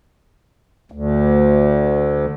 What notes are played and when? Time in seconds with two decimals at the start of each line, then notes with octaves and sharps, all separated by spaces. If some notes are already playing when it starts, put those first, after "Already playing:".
0.92 D2